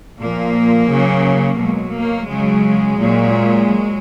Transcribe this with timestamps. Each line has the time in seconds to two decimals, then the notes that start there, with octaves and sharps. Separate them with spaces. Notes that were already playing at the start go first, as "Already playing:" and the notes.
0.19 A#2 F3 A#3
0.88 C#3 F#3
1.59 B2 F#3 G#3
1.93 A#3
2.28 C#3 F#3 G#3
2.98 A#2 F#3
3.67 F#3